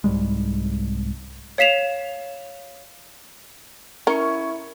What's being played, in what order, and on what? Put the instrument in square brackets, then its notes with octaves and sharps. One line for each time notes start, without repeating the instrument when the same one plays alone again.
[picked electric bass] C2 G#2 G3 G#3
[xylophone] C#5 F5 B6 E7 F7
[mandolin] C#4 C#6 [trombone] E4 [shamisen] A#4